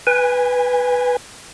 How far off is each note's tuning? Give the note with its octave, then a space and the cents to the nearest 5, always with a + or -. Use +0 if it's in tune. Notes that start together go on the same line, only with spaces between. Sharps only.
B4 +0 G#5 -25